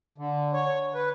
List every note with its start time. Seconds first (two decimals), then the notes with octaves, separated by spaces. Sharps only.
0.18 D3
0.53 C#5
0.94 B4